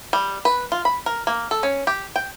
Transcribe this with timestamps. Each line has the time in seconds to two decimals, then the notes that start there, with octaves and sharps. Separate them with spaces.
0.13 G3
0.45 B4
0.72 F4
0.85 B5
1.06 A#4
1.27 A#3
1.51 A4
1.63 C#4
1.87 G4
2.16 G5